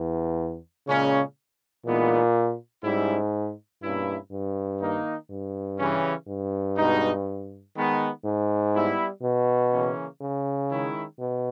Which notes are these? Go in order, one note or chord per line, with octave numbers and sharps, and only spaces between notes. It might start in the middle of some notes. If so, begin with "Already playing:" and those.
Already playing: E2
A#2 C#3 G#3 C#4
A#2 E3 G#3 B3 D#4
G#2 G3 C#4 E4
G2 B2 A#3 C#4 E4
G2
D#3 A#3 D#4
G2
C#3 E3 G3 C#4
G2
B2 G#3 D#4
D#3 G#3 B3
G#2
G3 B3 E4
B2
C#3 E3 A#3 C#4
C#3
D#3 G#3 C#4 E4
B2